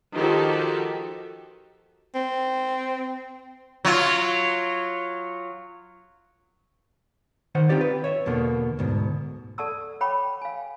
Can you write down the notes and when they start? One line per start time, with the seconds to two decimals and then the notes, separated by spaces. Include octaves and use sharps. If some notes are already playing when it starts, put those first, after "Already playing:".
0.14 D#3 F3 F#4 G4 A4
2.15 C4
3.85 F#3 F4
7.55 D#3 C5 F#5
7.69 C4 D#4 F4 G4 D5
7.81 B4
8.04 C#5 E5
8.26 E2 B2 D3 A#3
8.79 D2 G#2 B2
9.58 A4 D5 F#5 A5 C#6 E6
10.01 C#5 F#5 G5 B5 C#6 D6
10.41 F5 G#5